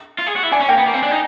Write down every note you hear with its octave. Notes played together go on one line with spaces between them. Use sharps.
F4
G#4
F#4
E4
D4 G#5
C#4
A#3 G5
B3
A#3
C4
D4
D#4